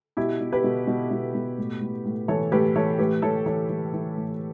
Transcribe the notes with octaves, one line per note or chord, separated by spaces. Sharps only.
B2 E4 G4
B2
G4 B4
B2
B2
B2
B2
A2
A2
A2
E3 A4 C#5
A2 G4 B4
E3 A4 C#5
A2 G4 B4
E3 A4 C#5
E3 A4 C#5
E3
E3
A2